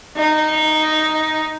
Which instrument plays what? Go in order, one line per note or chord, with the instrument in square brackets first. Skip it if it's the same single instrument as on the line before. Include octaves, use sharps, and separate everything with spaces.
[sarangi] D#4